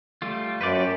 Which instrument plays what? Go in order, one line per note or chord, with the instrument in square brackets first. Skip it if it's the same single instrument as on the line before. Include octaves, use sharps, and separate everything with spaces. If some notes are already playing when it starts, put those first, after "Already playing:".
[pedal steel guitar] G3 A3 F4
[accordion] F#2 [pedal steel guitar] B4 C5 D5
[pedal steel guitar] F#4 G4